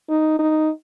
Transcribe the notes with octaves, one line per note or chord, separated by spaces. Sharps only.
D#4
D#4